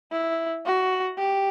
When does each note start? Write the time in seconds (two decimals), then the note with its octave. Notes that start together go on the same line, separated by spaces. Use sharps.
0.12 E4
0.65 F#4
1.18 G4